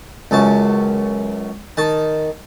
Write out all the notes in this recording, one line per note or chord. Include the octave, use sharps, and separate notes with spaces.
C#2 F#2 A5
D#3 A5